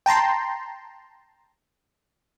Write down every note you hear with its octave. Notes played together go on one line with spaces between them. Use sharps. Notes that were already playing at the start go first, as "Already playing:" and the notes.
G5 A5 A#5 C6